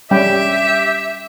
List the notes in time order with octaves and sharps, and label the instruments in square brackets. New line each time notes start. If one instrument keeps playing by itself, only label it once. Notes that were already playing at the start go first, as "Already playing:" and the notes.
[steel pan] G3 C#4 G5 [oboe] G4 [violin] E5